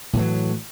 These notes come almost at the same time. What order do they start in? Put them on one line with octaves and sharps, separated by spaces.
A2 E3 F#3